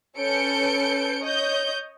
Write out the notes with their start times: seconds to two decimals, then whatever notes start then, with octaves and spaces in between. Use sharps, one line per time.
0.18 C#4 A4 B4 G6 C#7 D7
1.21 C#5 D#5 G6